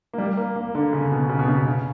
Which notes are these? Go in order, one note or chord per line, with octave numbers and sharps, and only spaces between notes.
A#3
G3
A#3
A#3
D3
C#3
B2
C#3
B2
C#3
C#3